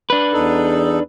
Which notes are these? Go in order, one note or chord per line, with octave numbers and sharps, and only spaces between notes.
D4 B4
E2 D#4 A4